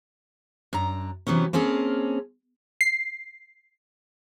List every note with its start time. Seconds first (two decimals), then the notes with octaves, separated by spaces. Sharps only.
0.73 F#2 D4 A#5
1.27 C3 E3 F#3 B3 C#4
1.53 A#3 C4 C#4 G#4 A4
2.81 C7